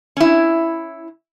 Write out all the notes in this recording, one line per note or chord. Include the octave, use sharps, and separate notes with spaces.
C#4 E4